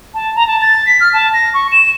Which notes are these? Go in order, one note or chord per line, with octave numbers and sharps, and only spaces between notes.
A5
A#5
A5
A6
B6
F6
A5
A#6
C#6
E7